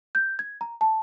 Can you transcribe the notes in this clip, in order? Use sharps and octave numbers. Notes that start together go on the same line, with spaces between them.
G6
G#6
A#5
A5